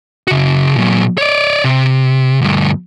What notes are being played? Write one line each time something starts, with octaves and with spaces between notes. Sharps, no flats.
C#3 F#4
A#2 F#3
C#5 D5
C3
D2 G2